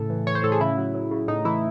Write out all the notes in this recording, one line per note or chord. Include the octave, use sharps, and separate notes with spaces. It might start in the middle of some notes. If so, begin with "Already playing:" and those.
Already playing: A2 C#3 A4
E3
E3 C#5
C5
A2 A4
G#4
C#3 E4
F#3
F#3
C#3
A2 D#4
E3 E4